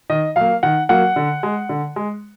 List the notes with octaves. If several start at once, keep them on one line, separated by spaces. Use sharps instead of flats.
D#3 D#5
F#3 A#3 F5
D#3 F#5
F#3 A#3 F#5
D3
G#3
D3
G#3